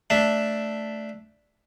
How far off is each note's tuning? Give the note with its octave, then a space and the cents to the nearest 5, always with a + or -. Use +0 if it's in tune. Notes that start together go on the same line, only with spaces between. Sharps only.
A3 +0 D4 +0 E5 +0